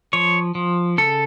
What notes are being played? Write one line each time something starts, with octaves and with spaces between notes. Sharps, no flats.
F3 C#5
F3
C#3 A4